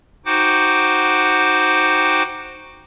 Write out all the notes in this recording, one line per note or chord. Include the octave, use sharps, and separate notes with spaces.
D#4 F#4 C5 F#5 G5 D6